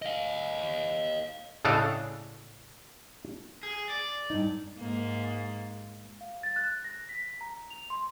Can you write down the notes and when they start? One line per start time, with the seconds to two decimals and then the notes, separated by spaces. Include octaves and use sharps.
0.02 D#5 F5
1.65 A2 C#3 D4 A4 D#5 F5
3.63 G#4
3.90 D5
4.30 G2 D#4
4.79 G#2 A#3
6.21 F5
6.43 A6
6.56 F#6
6.84 A#6
7.09 B6
7.41 A#5
7.70 F7
7.90 C6